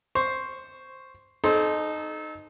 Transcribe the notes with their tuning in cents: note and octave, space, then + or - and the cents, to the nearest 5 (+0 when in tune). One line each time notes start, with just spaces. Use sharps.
C5 +0 C#6 +0
D#4 -15 A4 -35 C5 +0